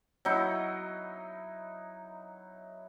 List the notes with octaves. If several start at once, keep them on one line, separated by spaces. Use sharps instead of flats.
F#3 D#4 E4